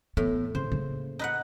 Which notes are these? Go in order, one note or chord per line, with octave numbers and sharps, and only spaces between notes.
A2 E3 B3
C#3 C5
C#3 A#3
D#4 B4 F#5